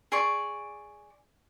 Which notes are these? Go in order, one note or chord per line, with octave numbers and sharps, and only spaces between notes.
G#4 D5 C#6